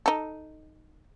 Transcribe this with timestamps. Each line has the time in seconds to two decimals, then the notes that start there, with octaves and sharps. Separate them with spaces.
0.06 D#4 A4